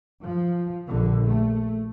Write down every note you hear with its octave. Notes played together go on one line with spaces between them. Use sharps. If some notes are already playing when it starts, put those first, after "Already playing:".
F3
A#1 D3
A3